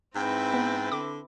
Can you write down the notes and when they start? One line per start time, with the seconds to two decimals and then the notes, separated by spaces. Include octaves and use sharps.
0.15 G#2 C4 E4 B4 G5
0.54 B3
0.92 D3 D6